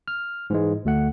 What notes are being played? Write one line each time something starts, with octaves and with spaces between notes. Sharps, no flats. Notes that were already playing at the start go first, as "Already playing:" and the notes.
F6
G#2 E3 G#3
D2 A3 F#5